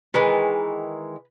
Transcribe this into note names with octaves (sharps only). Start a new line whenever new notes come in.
D#3 E3 G#3 B4